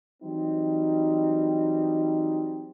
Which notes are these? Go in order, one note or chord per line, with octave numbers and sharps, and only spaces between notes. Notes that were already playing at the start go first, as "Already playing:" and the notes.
E3 F#3 G3 C4 D#4